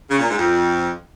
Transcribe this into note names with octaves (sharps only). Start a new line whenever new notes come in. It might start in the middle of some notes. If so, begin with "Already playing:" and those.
C#3
A#2
G#2
F2